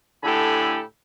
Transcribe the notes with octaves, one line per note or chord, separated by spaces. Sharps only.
A2 D3 G4 A4 G#5 B5